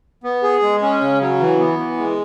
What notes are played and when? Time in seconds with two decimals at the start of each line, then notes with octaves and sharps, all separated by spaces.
0.24 B3
0.43 G#4
0.62 G#3
0.82 C#4
1.01 C#3
1.21 F#3
1.40 E3
1.59 B3
1.79 E3
1.97 G#3